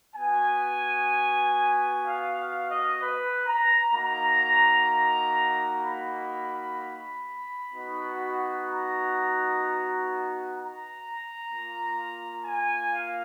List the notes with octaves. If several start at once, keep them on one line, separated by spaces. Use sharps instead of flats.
B3 F#4 G#5
F5
F5
D#5
B4
A#5
A#3 D#4 F#4 A#5
B5
B3 D#4 F#4
A#5
A#5
A#3 F4
G#5
F5